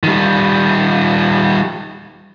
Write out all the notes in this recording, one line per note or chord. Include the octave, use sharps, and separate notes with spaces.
D#3 G3